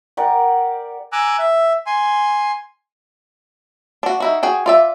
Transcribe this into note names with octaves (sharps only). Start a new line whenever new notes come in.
G4 A#4 D5 F#5
G#5 A#5 D6 E6 F#6
E5
G#5 C6
D4 F#4
D#4 E4 F#4
F#4 G#4 G5
F4 D5 E5